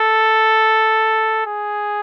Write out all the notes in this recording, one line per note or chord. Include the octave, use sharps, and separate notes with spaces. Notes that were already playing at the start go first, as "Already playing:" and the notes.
Already playing: A4
G#4